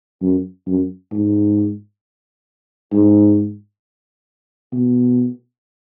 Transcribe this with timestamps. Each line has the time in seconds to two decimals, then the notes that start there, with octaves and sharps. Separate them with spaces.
0.22 F#2
0.67 F#2
1.12 G#2
2.92 G#2
4.73 B2